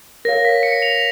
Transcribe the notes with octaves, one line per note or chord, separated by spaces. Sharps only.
A#4 C#5 F5 A#6
B6
C#7
F7